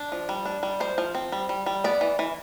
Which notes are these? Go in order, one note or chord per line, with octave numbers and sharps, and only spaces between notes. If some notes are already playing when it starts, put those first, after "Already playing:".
Already playing: D4
F3
G3
D4
G3
F3 C5
F3
C4
G3
G3
G3
B3 D5
E3
E3